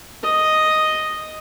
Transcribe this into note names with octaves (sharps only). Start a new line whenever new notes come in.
D#5